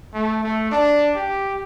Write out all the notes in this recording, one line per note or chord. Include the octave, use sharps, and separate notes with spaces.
A3
A3
D4
G4